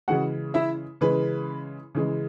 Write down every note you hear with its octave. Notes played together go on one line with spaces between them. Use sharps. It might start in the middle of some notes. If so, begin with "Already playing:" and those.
C#3 E3 G#3 F#4 F#5
E4 E5
C#3 E3 G#3 B4
C#3 E3 G#3